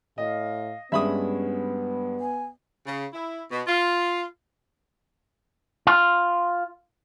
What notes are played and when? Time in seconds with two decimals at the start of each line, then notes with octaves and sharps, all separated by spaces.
0.18 A2 D#5 F5
0.92 G2 G#3 B3 C#4 E5 B5 D#6
2.20 G#5
2.86 C#3
3.13 E4
3.51 B2
3.67 F4
5.87 F4